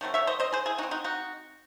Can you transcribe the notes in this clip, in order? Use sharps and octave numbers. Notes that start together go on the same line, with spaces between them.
D#3 F#3 A3 C4
C#5 E5
C5 D#5
C5 D#5
G#4 C5
E4 G#4
E3 C4 D#4 F#4
D#4 F#4
D#4 F#4